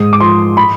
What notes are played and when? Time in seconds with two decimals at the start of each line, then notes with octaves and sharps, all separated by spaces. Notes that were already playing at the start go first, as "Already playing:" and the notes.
Already playing: G#2 D#6
0.13 D6
0.20 F3 C6
0.57 B5